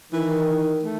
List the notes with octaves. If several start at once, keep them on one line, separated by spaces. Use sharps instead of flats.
D#3 E3
A3